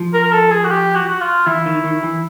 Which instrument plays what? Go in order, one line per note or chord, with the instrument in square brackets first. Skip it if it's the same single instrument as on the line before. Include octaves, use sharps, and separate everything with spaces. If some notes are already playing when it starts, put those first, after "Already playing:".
Already playing: [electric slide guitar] F3
[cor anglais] A#4
A#4
A4
G#4
F#4
G4
F#4
F#4
F4
[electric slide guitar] E3 [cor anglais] E4
[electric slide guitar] D#3
D#3
E3